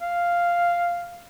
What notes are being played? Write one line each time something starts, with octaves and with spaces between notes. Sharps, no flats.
F5